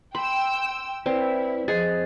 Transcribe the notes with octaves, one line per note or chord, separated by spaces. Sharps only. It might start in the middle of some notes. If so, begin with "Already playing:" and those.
G5 B5 C6 E6
C4 E4 B4 D5
F2 G#4 C5 D#5 A6